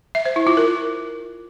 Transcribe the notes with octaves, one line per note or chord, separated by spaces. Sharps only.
E5
C5
E4
F4
A#4